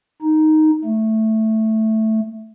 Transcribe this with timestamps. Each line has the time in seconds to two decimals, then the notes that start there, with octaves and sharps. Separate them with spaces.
0.22 D#4
0.85 A3